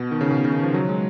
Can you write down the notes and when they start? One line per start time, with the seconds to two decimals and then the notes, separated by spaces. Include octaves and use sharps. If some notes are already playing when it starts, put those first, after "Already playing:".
Already playing: B2
0.11 D#3
0.21 C#3
0.31 B2
0.45 C#3
0.52 D#3
0.63 F3
0.74 F#3
0.89 G#3